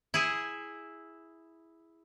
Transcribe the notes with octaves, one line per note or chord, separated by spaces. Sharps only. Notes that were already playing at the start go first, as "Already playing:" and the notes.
E4 G#4